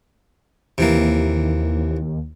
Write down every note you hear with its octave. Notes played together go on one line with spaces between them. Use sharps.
D#2 C3 E3 A#3